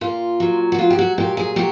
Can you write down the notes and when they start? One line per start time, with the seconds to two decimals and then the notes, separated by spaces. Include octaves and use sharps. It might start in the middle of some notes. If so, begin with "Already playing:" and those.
0.01 A#2 F4
0.40 F#3
0.72 F#4
0.78 F#3 F4
0.90 G4
0.99 F#4
1.18 A#2 G4
1.37 G#4
1.56 F#3 G4